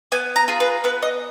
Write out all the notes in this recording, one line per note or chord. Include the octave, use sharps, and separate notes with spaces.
B3 G#5
A#5
F4 G#4
B4
B3 B4
D#5